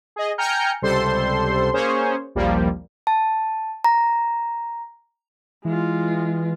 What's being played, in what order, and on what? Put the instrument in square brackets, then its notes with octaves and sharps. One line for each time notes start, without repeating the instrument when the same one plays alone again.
[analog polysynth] G#4 D#5
G5 G#5 A#5 F6 G6 C#7
C#2 C3 G3 A4 C5 C6
A#3 C#4 G#4 C5 C#5
A#1 D#2 F3 G3 A#3
[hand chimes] A5
A#5
[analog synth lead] E3 [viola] G#3 F4